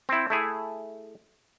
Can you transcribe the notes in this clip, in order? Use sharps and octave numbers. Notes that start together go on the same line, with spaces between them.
C4 E4
A3 E4 G#4